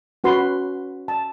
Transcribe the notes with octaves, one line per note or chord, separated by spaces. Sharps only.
C#4 F#4 B4 C6
A5